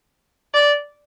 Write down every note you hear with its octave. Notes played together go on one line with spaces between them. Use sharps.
D5